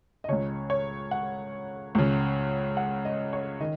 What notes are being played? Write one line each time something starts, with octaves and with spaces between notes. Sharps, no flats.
D#5
C#2 C#3 C#5
C#5
F#5
C#2 C#3
F#5
D#5
C#5
D#3 D#5